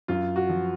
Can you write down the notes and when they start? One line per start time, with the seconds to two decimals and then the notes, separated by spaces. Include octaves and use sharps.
0.08 F#2 F4
0.36 F#4
0.49 F3